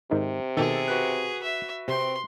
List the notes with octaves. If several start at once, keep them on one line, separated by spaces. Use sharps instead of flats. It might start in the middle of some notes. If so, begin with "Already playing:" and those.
G#2 C3 D#3 D#4
B2 D#3 G#4 A4
F#4 B4 F#6
E5
C3 C4 G5 C6